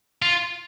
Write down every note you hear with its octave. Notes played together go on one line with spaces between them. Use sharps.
F4